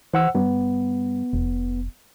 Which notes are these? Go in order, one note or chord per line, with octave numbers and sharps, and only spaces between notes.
E3 C5 F#5 E6
G2 B3
F1